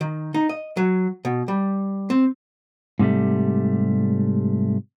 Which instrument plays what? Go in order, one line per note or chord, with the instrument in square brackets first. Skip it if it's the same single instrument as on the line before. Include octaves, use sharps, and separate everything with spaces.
[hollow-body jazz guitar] D#3
D#4
D#5
F#3
B2
G3
C4
[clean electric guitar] G#2 C3 G3 A3